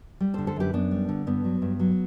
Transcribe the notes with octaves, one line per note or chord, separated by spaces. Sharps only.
G3
A4 C5
D3
A4 C5
F#2 G4 B4
F#2 B3 D4
G3
D3
G2 B3
F#3
G2
F#3